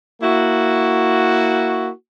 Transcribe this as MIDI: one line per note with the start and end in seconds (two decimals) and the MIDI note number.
0.21 1.90 58
0.21 1.90 64
0.21 1.90 66